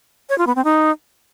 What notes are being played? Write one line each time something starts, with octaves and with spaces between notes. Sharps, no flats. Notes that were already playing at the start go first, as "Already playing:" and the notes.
C#5
F4
B3
C4
D#4